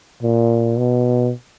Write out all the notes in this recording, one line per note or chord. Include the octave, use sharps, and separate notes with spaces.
A#2
B2